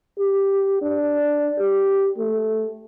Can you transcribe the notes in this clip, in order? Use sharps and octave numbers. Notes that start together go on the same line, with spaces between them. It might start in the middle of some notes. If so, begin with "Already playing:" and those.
G4
D4
G4
A3